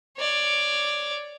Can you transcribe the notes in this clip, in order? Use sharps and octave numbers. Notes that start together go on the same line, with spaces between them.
C#5 D5